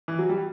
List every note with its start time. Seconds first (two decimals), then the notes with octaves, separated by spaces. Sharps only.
0.08 E3
0.19 F#3
0.29 G3